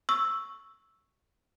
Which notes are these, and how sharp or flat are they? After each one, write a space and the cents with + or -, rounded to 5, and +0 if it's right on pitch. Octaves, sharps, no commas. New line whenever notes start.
C#6 +0 E6 +0